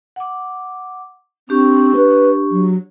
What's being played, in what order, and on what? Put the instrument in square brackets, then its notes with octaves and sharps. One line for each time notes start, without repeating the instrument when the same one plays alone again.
[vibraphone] F#5 D6
[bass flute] C4 [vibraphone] D4 G4 C#6
[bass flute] B4
F#3